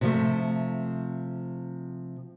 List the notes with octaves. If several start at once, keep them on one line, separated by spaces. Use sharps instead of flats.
C3 F3 A3